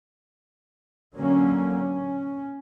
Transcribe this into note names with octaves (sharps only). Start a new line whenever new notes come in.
D3 F#3 A#3 C#4
C#4